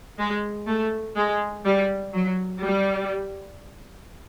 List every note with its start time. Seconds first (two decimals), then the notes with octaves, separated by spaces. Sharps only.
0.19 G#3
0.67 A3
1.17 G#3
1.65 G3
2.13 F#3
2.63 G3